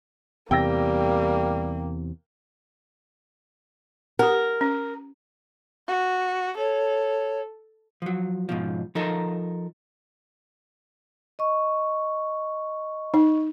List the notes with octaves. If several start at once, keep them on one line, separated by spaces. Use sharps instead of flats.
E2 C3 G3 A#3 G5 E6 A#6
G4 A#4 F#5
C#4
F#4
A4 C#5
F3 F#3
G#2 B2 F3
F3 D#4 A4 A#4
D#5 C#6
D#4